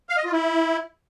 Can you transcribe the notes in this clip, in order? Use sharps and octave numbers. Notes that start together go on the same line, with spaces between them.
F5
D#5
F4
E4